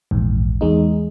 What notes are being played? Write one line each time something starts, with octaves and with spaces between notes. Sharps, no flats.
A#1 E2 G#2
E2 G#3 D#4